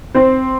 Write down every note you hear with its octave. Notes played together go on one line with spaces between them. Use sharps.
C4 C5